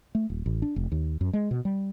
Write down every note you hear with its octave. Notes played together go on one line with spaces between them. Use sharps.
A3
D#1
A1
D4
F1
D#2
F#2
G#3
B2
G3